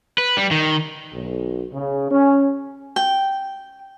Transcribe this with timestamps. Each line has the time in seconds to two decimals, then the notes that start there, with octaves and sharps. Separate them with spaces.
0.18 B4
0.37 G3
0.51 D#3
1.13 B1
1.72 C#3
2.11 C#4
2.96 G5